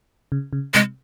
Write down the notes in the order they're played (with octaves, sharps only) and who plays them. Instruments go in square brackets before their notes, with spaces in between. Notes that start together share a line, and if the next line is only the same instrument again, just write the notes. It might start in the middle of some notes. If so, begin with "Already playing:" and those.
[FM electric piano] C#3
C#3
[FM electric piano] C3 [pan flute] G#3